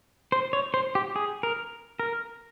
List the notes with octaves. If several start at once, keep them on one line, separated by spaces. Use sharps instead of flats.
C5
C#5
C5
G4
G#4
A#4
A#4